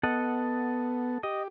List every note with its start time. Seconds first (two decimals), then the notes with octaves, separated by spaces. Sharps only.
0.03 B3 A4 D#5 F#5
1.23 G4 D#5